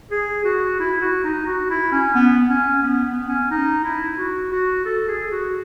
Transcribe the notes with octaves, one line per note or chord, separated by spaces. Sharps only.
G#4
F#4
E4
F#4
D#4
F#4
E4
C#4
B3
B3
C#4
B3
B3
C#4
D#4
E4
F#4
F#4
A4
G#4
F#4